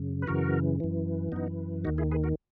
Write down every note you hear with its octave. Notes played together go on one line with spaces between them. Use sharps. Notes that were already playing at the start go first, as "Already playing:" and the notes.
Already playing: F#2 C#3
B4
F#2 C#3 E3 F#4 A#4
F#2 E3
F#2 E3 B3 D#4
D#2 D#3 D#4 F#4
E4 G#4
G#4 B4
F#4 A#4